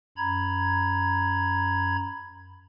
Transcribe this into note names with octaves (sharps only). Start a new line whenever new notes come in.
F#2 A#5 B5 G#6